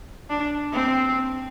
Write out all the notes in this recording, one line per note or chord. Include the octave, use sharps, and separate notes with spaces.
D4
C4